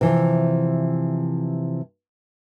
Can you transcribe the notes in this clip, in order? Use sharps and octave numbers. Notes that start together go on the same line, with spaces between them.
C3 E3 F3